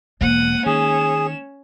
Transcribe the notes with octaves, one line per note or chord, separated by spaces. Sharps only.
E1 G#3 A#3 F#5 D#7
D#3 C#4 G#4 E7